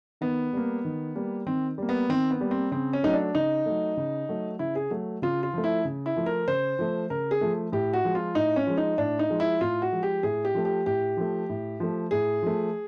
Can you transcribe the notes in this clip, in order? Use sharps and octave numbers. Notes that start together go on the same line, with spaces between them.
D#3 B3
G3 A#3
D#3
G3 A#3
D#3 C4
G3 A#3
B3
D#3 C4
B3
G3 A#3
C4
C#3 C4
C#4
F#3 A3 D#4
D4
C#3 D#4
F#3 A3
C#3
F#3 A3
C#3 E4
G#4
F#3 A3
C#3 F4
F4
F3 A3
E4
C#3
E4
F3 A3
A#4
C#3 C5
F3 A3
C#3 A#4
G#4
F3 A3
A2 G4
F#4
F3 G#3
F4
A2 D#4
C#4
F3 G#3
D#4
A2 D4
D#4
F3 G#3
E4
A2 F4
F#4
F3 G#3
G4
A2 G#4
G4
F3 A3
G4
A2 G4
F3 A3
A2
F3 A3
A2 G#4
F3 A3